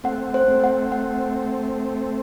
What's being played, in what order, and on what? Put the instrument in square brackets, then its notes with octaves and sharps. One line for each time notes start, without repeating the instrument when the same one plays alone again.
[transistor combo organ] A3 C4 [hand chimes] F#5
[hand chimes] C5
[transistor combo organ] A3 C4
[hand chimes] F#5
F#5